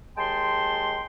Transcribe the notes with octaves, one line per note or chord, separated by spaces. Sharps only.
D#2 G#3 G5 A5 C6